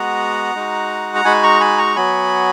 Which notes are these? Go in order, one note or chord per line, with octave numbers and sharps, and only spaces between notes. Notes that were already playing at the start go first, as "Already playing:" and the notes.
Already playing: G#3 B3 F#4 F#5 A#5
G#3 D#4 F#4
A#5
G#3 D#4 F#4 G#5 B5
A#5 C#6
G#5 B5
A#5 C#6
F#3 B3 F#4 G#5 B5